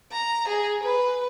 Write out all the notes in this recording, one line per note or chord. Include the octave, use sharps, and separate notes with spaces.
A#5
G#4
B4